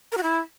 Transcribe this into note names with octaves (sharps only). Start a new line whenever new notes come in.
A#4
F#4
E4